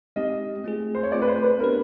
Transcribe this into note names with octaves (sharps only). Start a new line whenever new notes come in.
G#3 C4 D#4 G4 D#5
A3 C4 F4 G#4
C5
C#5
A3 C4 F4 G#4 D5
B4
C5
B4
B3 D4 G4 A#4 B4